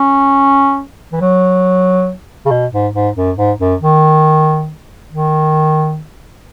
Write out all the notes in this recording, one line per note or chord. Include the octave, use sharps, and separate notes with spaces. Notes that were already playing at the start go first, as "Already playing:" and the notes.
Already playing: C#4
E3
F#3
C#3
B2
G#2
G#2
F#2
G#2
F#2
D#3
D#3